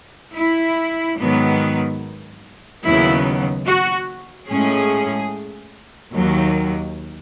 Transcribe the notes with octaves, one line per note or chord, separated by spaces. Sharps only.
E4
G#2 D#3 F#3 B3
D#2 C#3 F#3 B3 E4
F#4
A2 G#3 C#4 G#4
D#2 D#3 F#3